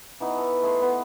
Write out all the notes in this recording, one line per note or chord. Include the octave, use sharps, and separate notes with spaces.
E3 B3 D#4
A4
A3 G#4 C6
B3